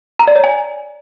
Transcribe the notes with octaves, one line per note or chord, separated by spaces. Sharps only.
A#5
D5
C#5
G#5